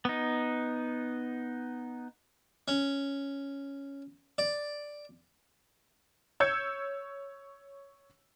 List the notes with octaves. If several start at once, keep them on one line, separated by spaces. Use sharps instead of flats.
B3 D#4
C#4
D5
C#5 E6 G6 G#6 C#7